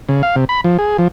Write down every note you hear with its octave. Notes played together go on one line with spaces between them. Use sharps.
C#3
F5
C3
B5
F3
G#4
F3